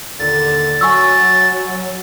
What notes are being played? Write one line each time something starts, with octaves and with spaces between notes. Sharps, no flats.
D#2 A#2 D3 A6
F#3 G#5 C#6 E6